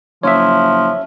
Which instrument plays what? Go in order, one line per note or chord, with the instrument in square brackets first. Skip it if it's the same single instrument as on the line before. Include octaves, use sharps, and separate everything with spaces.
[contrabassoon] F#1 [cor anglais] F3 [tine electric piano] C#5 E5